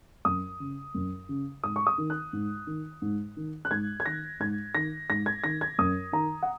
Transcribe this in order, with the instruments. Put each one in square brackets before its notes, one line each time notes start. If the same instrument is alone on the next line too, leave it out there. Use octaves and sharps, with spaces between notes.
[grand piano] F#2 D#6
C#3
F#2
C#3
G#2 D#6
C#6
D#6
D#3
F#6
G#2
D#3
G#2
D#3
F#6
G#2 G#6
G#6
D#3 A#6
G#2 G#6
D#3 A#6
G#2 A#6
G#6
D#3 A#6
G#6
F#2 D#6
D#3 A#5
F#5